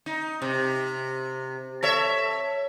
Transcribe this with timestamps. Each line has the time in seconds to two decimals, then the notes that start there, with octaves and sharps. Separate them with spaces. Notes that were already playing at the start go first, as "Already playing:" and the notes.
0.06 D#4
0.42 C3
1.83 A4 C#5 E5